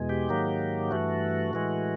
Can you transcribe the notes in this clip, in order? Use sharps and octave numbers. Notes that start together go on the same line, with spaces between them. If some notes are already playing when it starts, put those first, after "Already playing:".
Already playing: E2 B2 G#3
G4
G#2 D#3 F#3 A#3
G2 E3 A3 F#4
A2 E3 G#3